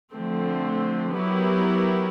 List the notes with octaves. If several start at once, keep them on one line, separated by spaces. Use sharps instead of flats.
D3 F3 A3 C4
F#3 B3 E4 G4 A#4